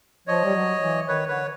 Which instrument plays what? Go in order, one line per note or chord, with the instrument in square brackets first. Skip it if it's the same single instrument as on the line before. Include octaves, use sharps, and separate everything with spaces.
[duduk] F3 [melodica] C#5 D#5
[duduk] G3
F#3
E3
[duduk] D#3 [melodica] B4 C#5
[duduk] D3 [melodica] B4 C#5